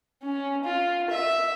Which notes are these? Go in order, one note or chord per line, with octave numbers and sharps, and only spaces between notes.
C#4
F4
E5